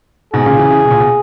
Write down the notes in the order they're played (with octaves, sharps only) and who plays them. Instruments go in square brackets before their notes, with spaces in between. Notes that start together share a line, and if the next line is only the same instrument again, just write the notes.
[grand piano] G#2 B2 [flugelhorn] G#4
[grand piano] A#2 C#3
C#3 E3
C#3 E3
B2
A#2
B2